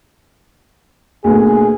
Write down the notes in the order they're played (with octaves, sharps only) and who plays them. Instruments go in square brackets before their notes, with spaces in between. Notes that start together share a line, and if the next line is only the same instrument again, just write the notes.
[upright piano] D2 A#2 B3 [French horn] G#4